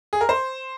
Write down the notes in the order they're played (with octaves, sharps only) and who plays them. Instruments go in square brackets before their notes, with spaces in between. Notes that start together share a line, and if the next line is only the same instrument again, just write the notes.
[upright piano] G#4
A#4
C5